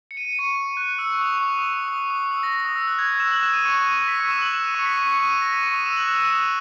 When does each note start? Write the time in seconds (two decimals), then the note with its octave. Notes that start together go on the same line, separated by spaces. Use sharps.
0.11 C#7
0.17 D#7
0.25 C#7
0.33 D#7
0.39 C#6 C#7
0.77 F#6
0.98 E6
1.10 C#6
1.21 D#6
1.32 C#6
1.43 D#6
1.58 D#6
1.73 E6
1.88 D#6
2.10 D#6
2.31 E6
2.43 A#6
2.54 A#6
2.65 D#6
2.76 E6
2.87 F#6
2.99 G#6
3.20 E6 E7
3.31 F#6 F#7
3.42 E6 E7
3.53 D#6 D#7
3.65 C#6 C#7
4.08 B6
4.20 C#6 C#7
4.31 E6 E7
4.42 F#6 F#7
4.53 E6 E7
4.64 D#6 D#7
4.75 C#6 C#7
4.86 B6
4.97 C#6 C#7
5.08 C#6 C#7
5.19 D#6 D#7
5.42 A#6
5.52 B6
5.63 C#6 C#7
5.74 D#6 D#7
5.85 E6 E7
5.96 F#6 F#7
6.08 E6 E7
6.19 E6 E7
6.30 D#6 D#7